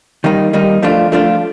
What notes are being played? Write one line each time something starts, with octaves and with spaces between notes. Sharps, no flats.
D#3 G3 A#3 D#4
D#3 G3 A#3 D#4
F3 A3 D4 F4
F3 A3 D4 F4